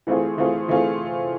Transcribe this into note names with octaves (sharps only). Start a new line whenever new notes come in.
E3 A3 C4 F4 G#4
E3 A3 C4 F4 G#4
E3 A3 C4 F4 G#4